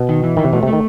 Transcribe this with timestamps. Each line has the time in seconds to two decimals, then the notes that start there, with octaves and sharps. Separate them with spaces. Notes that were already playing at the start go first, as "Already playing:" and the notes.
Already playing: B2
0.09 D#3
0.24 E3
0.37 D#3 E3
0.44 C3
0.53 B2 A3
0.63 C3
0.67 A3
0.73 D#3